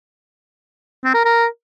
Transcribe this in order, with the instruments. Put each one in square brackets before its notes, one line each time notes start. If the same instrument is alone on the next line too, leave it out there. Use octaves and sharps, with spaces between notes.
[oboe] C4
A#4
A#4